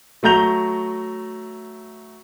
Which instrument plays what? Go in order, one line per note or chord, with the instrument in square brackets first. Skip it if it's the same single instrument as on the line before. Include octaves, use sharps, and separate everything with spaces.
[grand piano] F#3 A3 A#5 G6 F7